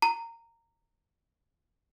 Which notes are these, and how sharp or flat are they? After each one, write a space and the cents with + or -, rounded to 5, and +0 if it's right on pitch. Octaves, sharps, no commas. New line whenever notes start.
A#5 -15